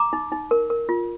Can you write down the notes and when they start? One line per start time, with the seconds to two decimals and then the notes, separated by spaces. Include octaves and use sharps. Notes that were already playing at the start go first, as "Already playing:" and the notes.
Already playing: A#5 D6
0.13 D#4
0.32 D#4
0.51 A#4
0.70 A#4
0.89 F4